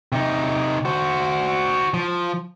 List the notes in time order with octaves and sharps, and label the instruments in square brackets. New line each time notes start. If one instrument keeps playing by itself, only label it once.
[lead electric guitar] C3 D#4
F#4 C5
F3